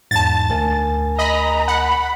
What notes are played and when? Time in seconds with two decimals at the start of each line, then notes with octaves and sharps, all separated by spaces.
0.11 E2 G#2 A5 A6
0.50 D2 A#4 G#5
1.18 D#5 A#5 B5
1.68 F#5 B5